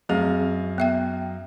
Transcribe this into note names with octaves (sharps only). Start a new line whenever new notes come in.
F#2 A3 C4 G#4 D#5 F5
B3 E5 G5